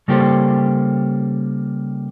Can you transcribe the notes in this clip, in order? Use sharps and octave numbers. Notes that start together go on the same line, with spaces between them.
C#3 G3 A#3 G4 A4 C5